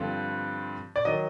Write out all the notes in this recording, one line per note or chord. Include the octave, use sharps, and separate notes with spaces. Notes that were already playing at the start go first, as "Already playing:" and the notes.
Already playing: G2 D3 F3 A3 C4
D5
D#3 F#3 D#5